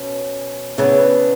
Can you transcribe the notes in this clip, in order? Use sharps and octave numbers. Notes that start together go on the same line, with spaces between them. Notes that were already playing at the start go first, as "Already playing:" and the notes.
Already playing: B2 C#4
C#3 E3 B3 D4